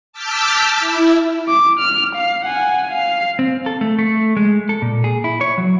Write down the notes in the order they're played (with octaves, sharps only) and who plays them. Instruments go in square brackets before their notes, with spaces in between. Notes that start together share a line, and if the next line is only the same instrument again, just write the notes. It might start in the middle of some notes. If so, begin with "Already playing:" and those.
[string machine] A5 D6 E6 F6 G6 B6
E4
[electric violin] D6
F6
F5
F#5 G#5
F5
[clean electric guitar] C4
A4
A3
A3
G#3
A4
A#2
G#4
E4
C#5
F#3